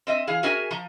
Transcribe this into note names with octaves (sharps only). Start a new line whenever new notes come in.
C4 D#5 E5
E3 G#4 F5
C#4 F#4 G#4 A#4 E5 G#5
F3 A#5